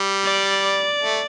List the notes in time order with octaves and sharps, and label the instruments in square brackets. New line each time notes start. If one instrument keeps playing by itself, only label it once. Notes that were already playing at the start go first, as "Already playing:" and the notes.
Already playing: [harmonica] G3
[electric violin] D5
[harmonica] A3